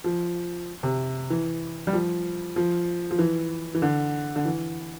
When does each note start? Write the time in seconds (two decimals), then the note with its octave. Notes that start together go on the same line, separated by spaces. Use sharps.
0.04 F3
0.83 C3
1.30 E3
1.87 G3
1.93 F3
2.56 F3
3.11 F3
3.19 E3
3.75 E3
3.82 D3
4.36 D3
4.45 E3